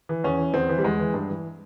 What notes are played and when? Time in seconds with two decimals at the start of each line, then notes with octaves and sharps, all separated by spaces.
0.09 E3
0.24 E2 C#4
0.38 E3
0.54 E2 C4
0.69 E3
0.78 G3
0.83 E2 G#3
0.99 E3
1.14 G2
1.29 E3